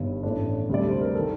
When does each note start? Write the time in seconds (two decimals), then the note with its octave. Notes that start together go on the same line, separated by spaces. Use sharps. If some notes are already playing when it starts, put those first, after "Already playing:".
Already playing: G1 G2 D#3
0.23 A1 A2 A3 D4
0.69 D2 C3 G3 D4 D5
0.88 C5
1.01 A#4
1.15 D#3 A4